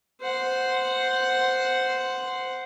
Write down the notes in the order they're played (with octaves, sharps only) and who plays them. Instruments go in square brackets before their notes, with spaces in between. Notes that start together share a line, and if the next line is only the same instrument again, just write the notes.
[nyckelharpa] C5 F#5